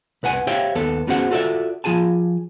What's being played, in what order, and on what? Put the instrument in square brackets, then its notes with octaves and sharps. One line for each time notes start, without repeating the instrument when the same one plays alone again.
[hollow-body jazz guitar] C2 B4 F#5 G#5
G4 C5 C#5 E5 F5 G5
D#2 B3 A4
B3 C#4 F#4 G#4 C5 F#5
F4 F#4 A4 B4 D5 E5
F3 F4 G#4 G#5 A5